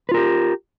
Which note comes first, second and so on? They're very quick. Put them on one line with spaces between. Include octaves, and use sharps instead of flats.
B4 F4 A#4 G4